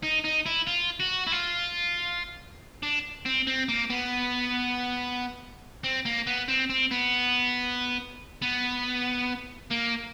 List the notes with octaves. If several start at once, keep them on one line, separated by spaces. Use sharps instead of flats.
D#4
D#4
E4
F4
F#4
E4
F4
D4
C4
C4
A#3
B3
C4
A#3
B3
C4
C4
B3
B3
A#3